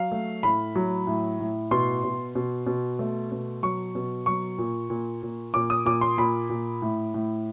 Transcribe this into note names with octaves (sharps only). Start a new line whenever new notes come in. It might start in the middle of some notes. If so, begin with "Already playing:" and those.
Already playing: F#3 F5
A3
A2 B5
F#3
A2
A2
B2 C6
B2
B2
B2
A3
B2
F#3 C#6
B2
F#3 C#6
A#2
A#2
A#2
A#2 D6
D#6
A#2 D6
C6
A#2 B5
A#2
A2
A2